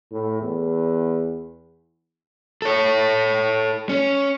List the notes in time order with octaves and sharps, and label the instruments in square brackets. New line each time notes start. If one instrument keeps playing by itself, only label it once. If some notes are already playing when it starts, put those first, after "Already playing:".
[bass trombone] A2
E2
[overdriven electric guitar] A4 C#5
C#4